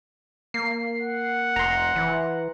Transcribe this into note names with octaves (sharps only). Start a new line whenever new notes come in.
A#3 C7
F#5
F1 A#5 C6
E3